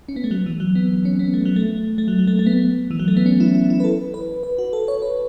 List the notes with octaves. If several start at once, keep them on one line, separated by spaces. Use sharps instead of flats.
C#4
B3
A3
F#3
E3
F#3
B3
C#4
B3
A3
F#3
A3
A3
F#3
F#3
A3
A3
B3
E3
F#3
A3
B3
C#4
E4
E4
E4
B4
A4
B4
B4
F#4
A4
C#5
B4